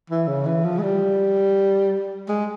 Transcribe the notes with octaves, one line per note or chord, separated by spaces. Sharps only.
E3
C#3
E3
F3
G#3
G3
G#3